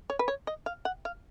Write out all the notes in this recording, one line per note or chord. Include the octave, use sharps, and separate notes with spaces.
C#5
B4
C#5
D#5
F5
F#5
F5